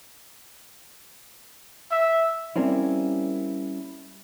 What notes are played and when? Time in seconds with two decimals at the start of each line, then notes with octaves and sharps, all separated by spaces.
1.92 E5
2.56 G3 A#3 C4 C#4 E4